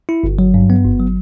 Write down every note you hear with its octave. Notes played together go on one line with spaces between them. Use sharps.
E4
G1
F#3
G2
B3
G1
F#3